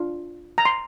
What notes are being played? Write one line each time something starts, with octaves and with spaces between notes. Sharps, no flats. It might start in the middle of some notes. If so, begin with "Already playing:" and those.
Already playing: D4 F4
A#5
C6